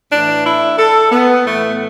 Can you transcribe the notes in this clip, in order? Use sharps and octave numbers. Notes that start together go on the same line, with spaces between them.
A2 E3 D4
E4
A4
B3
A2 E3 A3